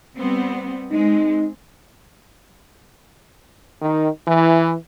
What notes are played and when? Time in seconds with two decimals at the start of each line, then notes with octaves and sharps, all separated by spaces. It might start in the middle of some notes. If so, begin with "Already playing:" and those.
0.16 G3 B3 C4
0.91 G#3 C4 D#4
3.82 D#3
4.26 E3